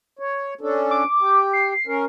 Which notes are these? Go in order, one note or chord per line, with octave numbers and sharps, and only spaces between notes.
C#5
C#4 D4 A4
D6
G4
C7
C#4 A#4